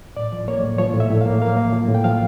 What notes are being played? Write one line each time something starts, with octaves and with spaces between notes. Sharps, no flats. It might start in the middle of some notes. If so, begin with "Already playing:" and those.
A2 D5
F3
A#3 C#5
A2
F3 C#5
A2
E5
A2
A#3 F5
A#3 F5
A#3
F3
A2
G5
F3 F5